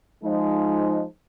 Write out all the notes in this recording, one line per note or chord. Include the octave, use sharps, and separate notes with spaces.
F3 G#3 D#4